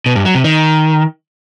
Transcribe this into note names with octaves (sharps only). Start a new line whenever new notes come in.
B2
G2
F#3
C3
D#3